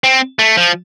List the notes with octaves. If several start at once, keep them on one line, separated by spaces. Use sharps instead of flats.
C4
A3
F3